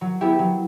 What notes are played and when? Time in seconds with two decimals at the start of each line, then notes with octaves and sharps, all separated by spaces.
0.01 F#3
0.21 B3 E4 G4
0.39 F#3